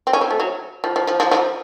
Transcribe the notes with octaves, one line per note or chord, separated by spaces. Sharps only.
C4
C#4
C4
A3
F#3
F3
F3
F3
F3
F3